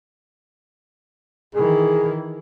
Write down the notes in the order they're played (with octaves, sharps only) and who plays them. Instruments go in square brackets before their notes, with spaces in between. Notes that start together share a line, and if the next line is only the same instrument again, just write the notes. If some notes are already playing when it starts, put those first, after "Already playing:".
[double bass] D#3 E3 [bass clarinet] G#4